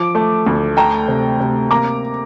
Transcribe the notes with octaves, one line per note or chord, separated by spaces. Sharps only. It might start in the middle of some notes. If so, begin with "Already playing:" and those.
Already playing: F3 D6
A3
D2
A3 G5 A#5
C3
C3
A#3 A#5 D6